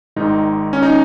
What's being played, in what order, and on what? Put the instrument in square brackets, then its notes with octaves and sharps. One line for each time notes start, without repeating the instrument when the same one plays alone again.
[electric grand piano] G#1 G#2 D#3 G#3 D#4
C#4
D#4